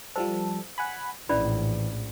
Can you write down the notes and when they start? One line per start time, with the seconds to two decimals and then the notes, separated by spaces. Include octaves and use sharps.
0.16 F3 G3 A4 C5
0.78 F#5 G#5 B5
1.29 A#1 A2 E3 C#4 D5 B5